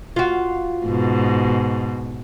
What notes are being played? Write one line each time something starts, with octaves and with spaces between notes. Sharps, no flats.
F4 F#4
G#2 B2